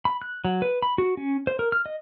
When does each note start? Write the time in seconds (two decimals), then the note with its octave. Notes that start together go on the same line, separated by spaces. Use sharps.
0.05 B5
0.22 F#6
0.45 F#3
0.62 B4
0.82 B5
0.98 F#4
1.17 C#4
1.47 C5
1.59 A#4
1.72 F6
1.86 D#5